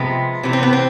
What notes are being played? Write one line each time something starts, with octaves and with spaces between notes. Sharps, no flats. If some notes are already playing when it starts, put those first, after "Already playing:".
Already playing: C3 F3 G#3 B3
C3 E3 B3
C4
B3
C4